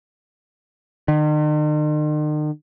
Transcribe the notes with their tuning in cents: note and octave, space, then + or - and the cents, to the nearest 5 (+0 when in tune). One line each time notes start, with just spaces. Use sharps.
D#3 -45